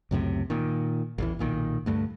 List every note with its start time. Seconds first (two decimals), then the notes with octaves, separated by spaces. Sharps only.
0.11 C#2 F#2 A2 C3
0.50 A#2 D#3
1.18 A1 E2 E3
1.39 B1 A#2 D#3
1.86 D2 G2 A3